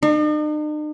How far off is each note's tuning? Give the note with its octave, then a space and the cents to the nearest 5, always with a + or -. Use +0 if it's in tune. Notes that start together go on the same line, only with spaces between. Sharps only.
D#4 -45